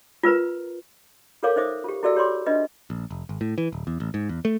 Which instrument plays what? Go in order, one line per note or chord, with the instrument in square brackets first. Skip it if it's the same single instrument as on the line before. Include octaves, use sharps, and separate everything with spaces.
[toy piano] F4 A#4 B4 A#5
F4 A4 A#4 C#5 F5 D6
D#4 C5 E5 D6 D#6
F4 G4
E4 F#4 A4 D5 E5 E6
G4 C#5 B5 C6 D6
D4 F4 B4 D#5 E5
[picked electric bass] A#1
F1
G#1
A2
E3
D1
E2
A1
G#2
E2
A3